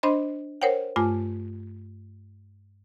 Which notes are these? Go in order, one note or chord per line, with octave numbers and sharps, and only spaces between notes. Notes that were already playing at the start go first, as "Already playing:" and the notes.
D4 C5 D#5 B5 C6
A#4 C5 C#5 F#5 G5
G2 A3 F4 G#5 D6